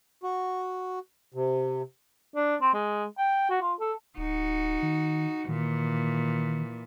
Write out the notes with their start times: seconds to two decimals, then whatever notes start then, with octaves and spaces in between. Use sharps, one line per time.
0.23 F#4
1.34 C3
2.35 D4
2.61 C4
2.74 G#3
3.18 G5
3.50 F#4
3.62 F4
3.80 A4
4.18 D1 D#4 F#4
4.83 D#3
5.49 A#2 D#3 E3